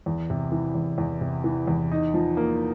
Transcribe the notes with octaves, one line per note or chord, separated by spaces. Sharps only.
E2
C3
E3
E2
E2
C3
E3
E2
D#4
F3
A#3